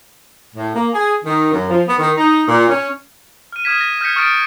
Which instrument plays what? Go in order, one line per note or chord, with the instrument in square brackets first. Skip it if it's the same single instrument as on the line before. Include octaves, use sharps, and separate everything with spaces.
[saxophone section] A2
A#3
G#4
D#3
F#2
F3
B3
D#3
D#4
A#2
C#4
[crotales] F6 D#7
D#6 F6 G#6 B6 E7
A#6
F6 G6 G#6 A#6 B6 C#7
C#6 D#6 F6 A6 D7